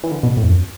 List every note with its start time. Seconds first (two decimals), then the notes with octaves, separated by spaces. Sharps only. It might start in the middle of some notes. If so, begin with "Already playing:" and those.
0.04 E3
0.11 D3
0.23 B2
0.37 A2
0.43 E2
0.49 F#2